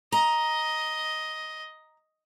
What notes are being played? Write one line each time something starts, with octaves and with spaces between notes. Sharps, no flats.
D#5 A#5